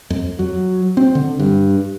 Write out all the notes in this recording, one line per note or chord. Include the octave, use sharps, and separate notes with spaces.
F2
F#3
C4
D3
G2